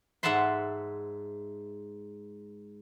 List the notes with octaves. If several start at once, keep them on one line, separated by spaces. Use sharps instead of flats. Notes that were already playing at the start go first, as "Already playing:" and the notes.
G#2 E5 F#5 A5 B5 C6